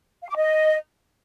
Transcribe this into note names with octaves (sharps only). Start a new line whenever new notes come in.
F5
D6
D#5